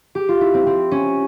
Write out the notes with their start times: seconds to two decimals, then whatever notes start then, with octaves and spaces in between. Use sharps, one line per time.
0.15 G4
0.29 F4
0.41 E4
0.54 C4
0.67 C4
0.91 C#4